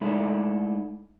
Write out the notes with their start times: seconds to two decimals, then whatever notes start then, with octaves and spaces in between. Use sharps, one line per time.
0.01 G#3 A3 D#4 E4 A4 D5